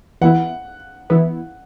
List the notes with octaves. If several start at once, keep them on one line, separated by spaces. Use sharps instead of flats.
E3 B3 E4 F#5
E3 B3 E4